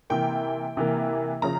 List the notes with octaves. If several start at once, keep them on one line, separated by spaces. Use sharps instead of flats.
C3 E3 A#3 G5
C3 E3 A#3
C#3 F3 A#5